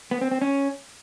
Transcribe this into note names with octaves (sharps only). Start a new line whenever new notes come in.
B3
C4
C4
C#4